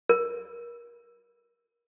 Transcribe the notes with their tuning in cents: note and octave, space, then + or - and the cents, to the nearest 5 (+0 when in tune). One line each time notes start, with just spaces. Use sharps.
A#4 +30